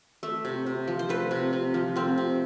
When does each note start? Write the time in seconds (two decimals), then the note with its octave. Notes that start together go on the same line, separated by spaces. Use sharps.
0.23 A3 E5
0.45 C3
0.66 C3
0.87 F3
0.99 C5
1.09 A3 B4
1.31 C3
1.53 C3
1.74 F3
1.96 A3 C4
2.18 C3